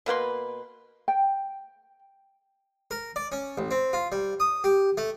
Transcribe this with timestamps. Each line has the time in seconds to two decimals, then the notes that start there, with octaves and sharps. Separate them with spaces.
0.06 B2 A#3 B4 C6
1.08 G5
2.91 A#4
3.16 D5
3.32 C#4
3.58 A1
3.71 C4
3.93 F4
4.12 G3
4.40 D#6
4.64 G4
4.98 A3